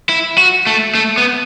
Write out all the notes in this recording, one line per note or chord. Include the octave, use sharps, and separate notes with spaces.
E4
F#4
A3
A3
B3